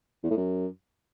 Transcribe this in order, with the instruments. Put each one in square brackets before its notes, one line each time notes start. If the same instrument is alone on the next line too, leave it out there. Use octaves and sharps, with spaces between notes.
[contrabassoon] E2
A2
F#2